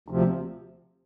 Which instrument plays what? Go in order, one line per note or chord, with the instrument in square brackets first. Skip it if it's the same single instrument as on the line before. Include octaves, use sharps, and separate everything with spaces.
[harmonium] D2 C3 F3